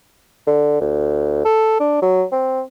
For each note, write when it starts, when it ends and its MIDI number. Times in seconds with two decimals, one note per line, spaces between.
0.47 0.80 50
0.80 1.42 38
1.45 1.77 69
1.80 1.99 62
2.02 2.24 54
2.32 2.62 60